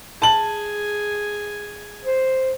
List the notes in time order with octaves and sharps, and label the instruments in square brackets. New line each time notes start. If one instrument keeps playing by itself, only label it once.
[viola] G#4 G#5 [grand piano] A5 F#7
[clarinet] C5